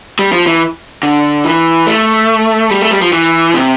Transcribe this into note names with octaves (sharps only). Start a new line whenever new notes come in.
G3
F3
E3
D3
E3
A3
G3
A3
G3
F3
E3
C3